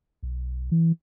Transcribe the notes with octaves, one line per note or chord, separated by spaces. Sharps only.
B1
E3